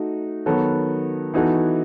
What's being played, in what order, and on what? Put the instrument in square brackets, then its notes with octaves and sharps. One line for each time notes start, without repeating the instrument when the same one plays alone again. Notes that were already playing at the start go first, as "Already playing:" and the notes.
Already playing: [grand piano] A3 D#4 F#4
D#3 F#3 B3 F#4 A4
E3 B3 D#4 F#4 A4